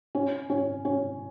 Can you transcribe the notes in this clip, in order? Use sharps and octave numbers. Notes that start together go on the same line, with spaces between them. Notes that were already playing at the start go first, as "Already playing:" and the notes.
C#4
C#4
C#4